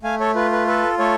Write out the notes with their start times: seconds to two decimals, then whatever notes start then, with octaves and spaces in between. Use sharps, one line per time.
0.03 A3 F5 G#5
0.20 A4 C#5
0.35 F4 B4
0.52 B4
0.67 A4 B4
0.99 A3 A4 C#5